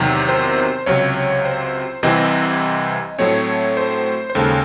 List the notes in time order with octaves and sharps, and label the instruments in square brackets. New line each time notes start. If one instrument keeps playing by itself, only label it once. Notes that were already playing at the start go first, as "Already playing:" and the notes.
Already playing: [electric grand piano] E2 C3 D#3 F#3
C5
C#2 C3 F#3 C#5
C5
C2 C3 E3 C4 D#5
A2 F#3 A3 C4 C#5
C5
C5
D#2 C#3 G#3 A4